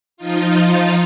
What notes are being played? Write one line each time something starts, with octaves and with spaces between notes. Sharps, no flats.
F3 D#4 F4